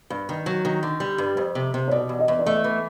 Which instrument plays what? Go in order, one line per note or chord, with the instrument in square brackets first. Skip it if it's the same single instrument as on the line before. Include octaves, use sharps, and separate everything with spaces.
[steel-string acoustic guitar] G2
D#3
F#3
D#3
D3
G3
G2
F2
C3
C3
[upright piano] C#5
[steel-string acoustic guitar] B2 [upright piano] D5
[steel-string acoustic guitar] E2
[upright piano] D#5
[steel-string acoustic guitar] E2
[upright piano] D5
[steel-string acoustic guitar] A3 [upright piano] D#5
[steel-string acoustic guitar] E3